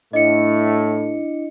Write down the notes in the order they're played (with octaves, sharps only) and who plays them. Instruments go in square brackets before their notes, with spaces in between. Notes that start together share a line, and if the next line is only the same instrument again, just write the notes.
[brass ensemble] A2 A3 [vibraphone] D4 E4 [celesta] D#5 C#7